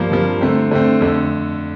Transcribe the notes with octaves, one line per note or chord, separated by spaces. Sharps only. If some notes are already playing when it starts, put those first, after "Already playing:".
Already playing: G2 F3 A#3
G2 F3 A#3
D3 A3 C4
D3 A3 C4
F2 D3 A3